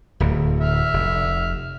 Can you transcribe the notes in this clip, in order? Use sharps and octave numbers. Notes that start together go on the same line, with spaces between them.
D1 D2
E5 F6
F1